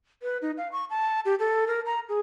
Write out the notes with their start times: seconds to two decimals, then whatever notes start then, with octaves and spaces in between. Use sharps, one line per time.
0.23 B4
0.42 D#4
0.58 F5
0.72 C#6
0.90 A5
1.25 G4
1.39 A4
1.67 A#4
1.86 A#5
2.09 G#4